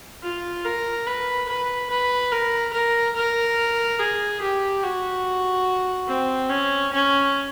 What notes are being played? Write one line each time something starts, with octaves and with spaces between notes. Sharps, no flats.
F4
A#4
B4
B4
B4
A#4
A#4
A#4
G#4
G4
F#4
C4
C#4
C#4